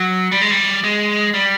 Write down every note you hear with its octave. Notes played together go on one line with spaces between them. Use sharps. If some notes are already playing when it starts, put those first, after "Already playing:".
Already playing: F#3
G3
G#3
G3
G#3
G3